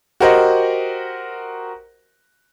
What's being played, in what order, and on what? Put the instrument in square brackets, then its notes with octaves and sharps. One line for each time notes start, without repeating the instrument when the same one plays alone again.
[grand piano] F#4 G4 A#4 C5 D#5 F#5